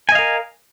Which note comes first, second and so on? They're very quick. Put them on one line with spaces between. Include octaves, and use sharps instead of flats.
G#5 D#5 F5 A#4